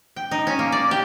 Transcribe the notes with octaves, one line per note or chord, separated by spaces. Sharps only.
G5
D#4
C#4
A#3
D5
G4